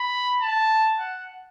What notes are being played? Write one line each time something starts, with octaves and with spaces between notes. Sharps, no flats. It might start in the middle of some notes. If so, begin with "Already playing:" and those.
Already playing: B5
A5
F#5